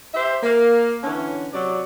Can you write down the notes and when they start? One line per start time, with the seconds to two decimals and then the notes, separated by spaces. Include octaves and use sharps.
0.14 G4 C5 E5
0.42 A#3
1.03 D3 E3 C#4
1.52 C3 F#3 D5